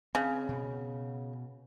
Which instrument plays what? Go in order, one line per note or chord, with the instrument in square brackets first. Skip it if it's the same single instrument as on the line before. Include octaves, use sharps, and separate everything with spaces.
[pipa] C#3 [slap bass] C4
[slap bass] B2